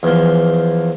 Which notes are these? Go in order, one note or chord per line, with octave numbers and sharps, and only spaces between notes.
E2 F3